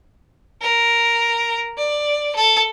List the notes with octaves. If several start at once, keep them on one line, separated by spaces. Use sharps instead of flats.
A#4
D5
A4